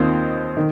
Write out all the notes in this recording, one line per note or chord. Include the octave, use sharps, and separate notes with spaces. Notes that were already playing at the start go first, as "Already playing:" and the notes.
Already playing: D#2 D#3 C4 F4 C5
D#3